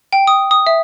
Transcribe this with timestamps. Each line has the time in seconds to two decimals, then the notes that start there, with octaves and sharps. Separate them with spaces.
0.13 G5
0.27 D#6
0.51 D#6
0.67 E5